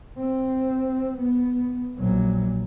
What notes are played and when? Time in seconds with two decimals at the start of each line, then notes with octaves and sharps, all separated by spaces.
0.19 C4
1.18 B3
1.98 A#1 F#3